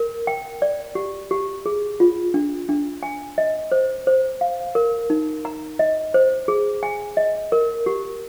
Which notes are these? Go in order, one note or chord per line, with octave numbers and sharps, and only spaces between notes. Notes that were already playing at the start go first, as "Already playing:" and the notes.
Already playing: A#4
G5
D5
G4
G4
G#4
F4
D4
D4
G#5
D#5
C5
C5
F5
A#4
D#4
A#5
D#5
C5
G#4
G#5
D#5
A#4
G4